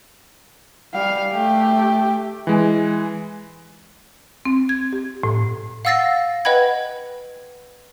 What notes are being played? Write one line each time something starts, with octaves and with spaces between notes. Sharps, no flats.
G3 F5
A3 G4
E3 G#3
C4
G#6
G4
A2
F5 F#5 E6 A6 A#6 C7
B4 D#5 F#5 G5 B5 G#6